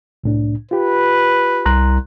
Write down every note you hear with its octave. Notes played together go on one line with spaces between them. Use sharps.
C2 A2 D4
F4 G4 B4
C2 A#5 C6 F#6